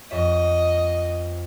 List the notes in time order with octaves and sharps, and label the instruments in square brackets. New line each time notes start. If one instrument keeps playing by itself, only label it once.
[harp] F2 C#5 E5 [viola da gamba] D#5